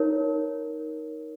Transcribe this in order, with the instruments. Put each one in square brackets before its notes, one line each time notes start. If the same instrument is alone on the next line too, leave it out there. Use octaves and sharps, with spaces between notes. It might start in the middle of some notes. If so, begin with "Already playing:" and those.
Already playing: [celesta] D#4 A#4 C#5